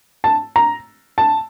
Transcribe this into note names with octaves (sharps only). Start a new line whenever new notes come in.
A5
A#5
A5